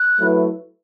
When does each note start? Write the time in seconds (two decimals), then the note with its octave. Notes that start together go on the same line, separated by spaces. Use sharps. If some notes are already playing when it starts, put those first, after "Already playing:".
Already playing: F#6
0.18 F#3 A3 E4 B4